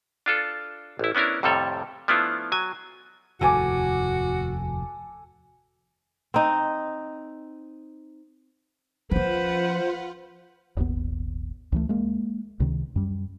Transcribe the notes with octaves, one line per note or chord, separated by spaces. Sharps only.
D4 F4 A4
A1 E4
B3 C#4 D4 E4 A#4
F2 A2 C3 G3 A4 C#5
F3 A3 B3 D4 E4 F4
F#3 G#5
F1 D#2 A2 F#4 A4 G#5 D6
C4 D#4
F3 C#4 F4 B4 C5 F#5
D#1 G#1 D#2 B3
C#2 E3 A3
G#3 A#3
C#2 C3 D#3
F#2 G3